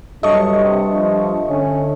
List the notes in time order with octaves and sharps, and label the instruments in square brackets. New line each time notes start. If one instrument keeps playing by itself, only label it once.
[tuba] G2 [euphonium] F#3 [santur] A3 [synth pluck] D#5 C#6
[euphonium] C3
F3
[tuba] D3 [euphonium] C#4